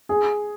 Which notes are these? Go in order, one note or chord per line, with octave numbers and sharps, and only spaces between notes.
G#4